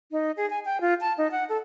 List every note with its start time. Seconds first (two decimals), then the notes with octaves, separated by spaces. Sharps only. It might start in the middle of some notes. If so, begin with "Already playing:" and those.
0.12 D#4
0.37 G#4
0.50 G#5
0.65 G5
0.81 F4
1.01 A5
1.18 D#4
1.31 F#5
1.49 A4